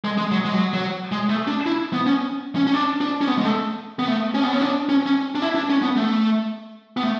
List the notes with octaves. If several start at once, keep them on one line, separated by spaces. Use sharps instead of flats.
G#3
G#3
F#3
G#3
F#3
F#3
G#3
A3
D4
E4
B3
C#4
C#4
C#4
D4
D4
C#4
B3
G#3
A3
B3
A3
C#4
B3
C#4
D4
C#4
C#4
D4
E4
D4
C#4
B3
A3
B3
A3